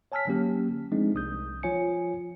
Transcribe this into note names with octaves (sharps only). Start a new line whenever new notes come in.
C#5 G#5 A5 E6 F6 B6
D3 F#3 A#3 C#4 G4
F3 G#3 A3 C4 D4 D#4
C2 D#6 G6
F3 F4 C#5 G#5 C#7